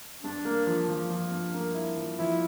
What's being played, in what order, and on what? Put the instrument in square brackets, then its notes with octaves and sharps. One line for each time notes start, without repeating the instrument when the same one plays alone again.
[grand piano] G2 [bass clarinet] D4
[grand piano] A#3
F3
F3
F3
G2
A#3
E4
F3
[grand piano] F3 [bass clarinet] E4